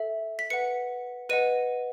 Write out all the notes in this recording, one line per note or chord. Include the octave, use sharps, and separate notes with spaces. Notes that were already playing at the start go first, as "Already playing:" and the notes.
Already playing: A4 E5
B6
B4 F#5 C#7
B4 D#5 F#5 D#7